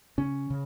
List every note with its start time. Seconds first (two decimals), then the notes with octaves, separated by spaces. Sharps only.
0.18 C#3 C#4
0.50 C#3